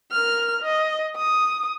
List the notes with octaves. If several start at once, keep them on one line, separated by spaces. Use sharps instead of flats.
A#4 F6
D#5
D#6